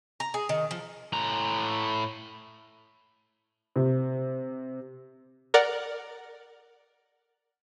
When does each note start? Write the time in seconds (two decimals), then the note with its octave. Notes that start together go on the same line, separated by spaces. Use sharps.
0.20 A#5
0.34 G#4
0.49 D#3
0.71 F3
1.13 A2 A#5
3.76 C3
5.54 A#4 D5 F#5